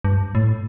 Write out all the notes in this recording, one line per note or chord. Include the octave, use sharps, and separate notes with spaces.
G2
A2